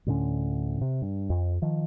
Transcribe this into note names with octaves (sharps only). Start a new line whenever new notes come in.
D2 A2 D3 C#4
C3
G2
F2
D#3 F3